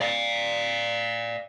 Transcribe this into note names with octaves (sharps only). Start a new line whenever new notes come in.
D5 F5